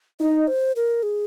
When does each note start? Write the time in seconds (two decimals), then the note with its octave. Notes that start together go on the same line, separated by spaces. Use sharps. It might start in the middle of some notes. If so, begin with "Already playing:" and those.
0.20 D#4 D#5
0.48 C5
0.76 A#4
1.03 G#4